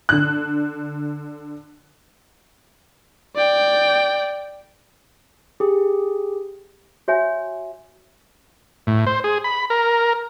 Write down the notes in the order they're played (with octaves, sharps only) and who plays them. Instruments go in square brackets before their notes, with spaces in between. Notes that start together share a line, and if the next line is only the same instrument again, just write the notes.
[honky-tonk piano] D3 F#6
[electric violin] D5 G5
[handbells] G4 G#4
[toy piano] F#4 C#5 E5 G#5
[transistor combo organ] A2
C5
G#4
B5
A#4